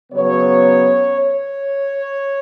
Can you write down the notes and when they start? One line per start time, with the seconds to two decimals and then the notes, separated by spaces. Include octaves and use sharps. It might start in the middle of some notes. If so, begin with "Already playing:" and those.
0.12 C#3 F#3 B3 C#5
1.20 C#5